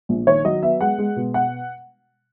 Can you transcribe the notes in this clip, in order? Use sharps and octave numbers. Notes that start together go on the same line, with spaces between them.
A#1
D#3 C#5
F#3 D#5
B3 E5
G#3 F#5
G#3
B2
F#5